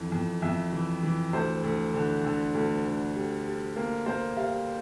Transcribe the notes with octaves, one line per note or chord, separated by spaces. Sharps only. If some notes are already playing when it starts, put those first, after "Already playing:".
Already playing: F2 E3
F2
F2 E5
E3
E3
D2 C5
D2
D3
D3
D2
D3
G3
G3
A#3
A#3 C5
G3 F5